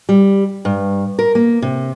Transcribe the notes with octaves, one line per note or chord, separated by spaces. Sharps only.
G3
G2
A#4
A#3
C3